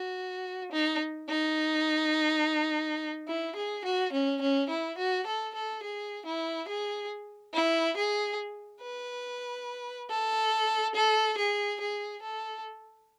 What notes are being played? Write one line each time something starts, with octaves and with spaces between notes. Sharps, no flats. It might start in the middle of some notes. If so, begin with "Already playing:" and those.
Already playing: F#4
D#4
D#4
E4
G#4
F#4
C#4
C#4
E4
F#4
A4
A4
G#4
E4
G#4
E4
G#4
B4
A4
A4
G#4
G#4
A4